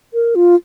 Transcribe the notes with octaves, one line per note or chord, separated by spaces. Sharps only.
A#4
F4